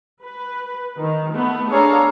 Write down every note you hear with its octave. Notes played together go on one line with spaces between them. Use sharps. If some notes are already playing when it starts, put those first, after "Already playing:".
B4
D#3
A3 B3
D4 G#4 A4 C#5 F5 A#5